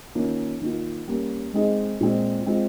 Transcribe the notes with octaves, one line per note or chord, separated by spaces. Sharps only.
D#3 A#3 C#4 F4
D#3 A#3 F4
G3 A#3 C#4
G#3 C4 D#4 G#4
A#2 G#3 C4
G#3 C4 F4